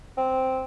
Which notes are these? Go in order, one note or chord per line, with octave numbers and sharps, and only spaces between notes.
C4